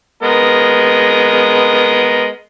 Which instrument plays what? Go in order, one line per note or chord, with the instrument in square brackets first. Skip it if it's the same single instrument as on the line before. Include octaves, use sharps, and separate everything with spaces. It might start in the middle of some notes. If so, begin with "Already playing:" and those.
[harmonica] G#3 B3 A#4